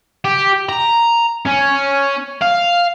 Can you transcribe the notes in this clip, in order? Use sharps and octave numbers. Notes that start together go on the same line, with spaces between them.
G4
A#5
C#4
F5